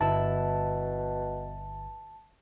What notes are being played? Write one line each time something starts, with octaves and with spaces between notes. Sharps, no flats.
G1 B2 E4 A5